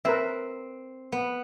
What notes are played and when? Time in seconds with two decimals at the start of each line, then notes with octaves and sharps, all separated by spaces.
0.05 C4 A#4 B4 E5
1.12 B3